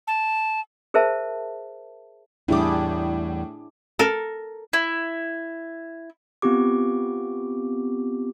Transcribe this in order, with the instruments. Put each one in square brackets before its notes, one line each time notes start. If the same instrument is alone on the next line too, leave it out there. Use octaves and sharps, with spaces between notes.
[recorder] A5
[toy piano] G#4 A#4 C5 E5 A5
[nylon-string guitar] E2 G3 [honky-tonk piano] A2 D6 [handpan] D4 E4 G#4
[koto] A4 A#4
[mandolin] E4
[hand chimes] B3 C4 F4 G4 D6